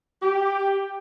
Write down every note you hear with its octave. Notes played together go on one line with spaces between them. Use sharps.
G4